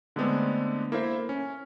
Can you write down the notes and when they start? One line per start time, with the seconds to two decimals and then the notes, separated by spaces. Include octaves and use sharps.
0.16 D3 G#3 A3 B3 C4 D4
0.92 A#3 E4 A4 C5 E5
1.29 C#4